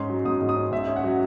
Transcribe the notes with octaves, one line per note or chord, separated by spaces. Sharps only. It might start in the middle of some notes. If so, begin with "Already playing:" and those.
Already playing: G#2 C#4 C6
F#3
G#2 D#6
G#2
D#6
C#4
G#2 E5
C#4
F#5
F#3